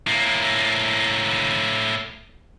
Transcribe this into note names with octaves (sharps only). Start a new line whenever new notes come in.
A2 A#3